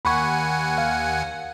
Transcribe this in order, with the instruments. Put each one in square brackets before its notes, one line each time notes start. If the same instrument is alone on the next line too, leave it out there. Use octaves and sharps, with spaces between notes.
[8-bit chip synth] D#2 F#5 G#5 [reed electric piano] B5 C#6
[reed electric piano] F5